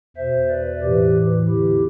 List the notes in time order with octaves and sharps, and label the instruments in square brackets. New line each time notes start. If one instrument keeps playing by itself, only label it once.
[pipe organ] E2 B2 C5 E5
B4 D5
A2 E3 G4 B4
E2 D3 E4 G4